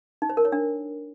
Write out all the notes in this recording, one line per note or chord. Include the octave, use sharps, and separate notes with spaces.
D#4
C5
A#4
C#5
D4